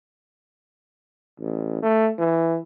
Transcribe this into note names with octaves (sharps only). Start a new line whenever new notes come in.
A1
A3
E3